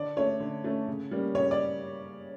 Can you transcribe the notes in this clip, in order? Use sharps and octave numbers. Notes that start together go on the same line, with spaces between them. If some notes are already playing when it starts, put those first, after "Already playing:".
Already playing: D3 D5
A3 C#4 C#5
D3
A3 C#4
C#3
G3 A#3 C#4
C#3 C#5
D5